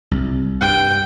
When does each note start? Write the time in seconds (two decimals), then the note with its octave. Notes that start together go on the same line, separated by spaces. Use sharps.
0.11 C2
0.61 G2 G5